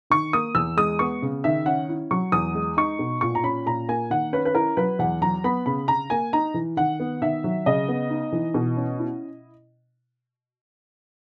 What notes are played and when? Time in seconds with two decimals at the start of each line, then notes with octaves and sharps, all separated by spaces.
0.10 D#3 C#6
0.33 A#3 D#6
0.55 E2 E6
0.77 G#3 D#6
0.99 B3 C#6
1.22 C#3
1.44 D#3 E5
1.66 C#4 F#5
1.89 E4
2.11 F#3 C#6
2.32 E2 D#6
2.55 G#3
2.77 D#4 C#6
2.99 B2
3.21 A#2 C#6
3.35 A#5
3.43 C#4 B5
3.66 A#2 A#5
3.89 A#3 G#5
4.10 D#3 F#5
4.33 C#4 B4
4.45 B4
4.55 E4 A#4
4.77 F#3 B4
4.99 E2 F#5
5.21 F#3 A#5
5.44 B3 B5
5.66 C#3 B5
5.88 C#3 A#5
6.10 A#3 G#5
6.33 D#4 A#5
6.54 E3
6.77 D#3 F#5
7.00 B3
7.22 D#3 E5
7.44 F#3
7.66 C#3 D#5
7.88 B3
8.10 D#4
8.32 E3
8.54 B2
8.77 C#4
8.99 E4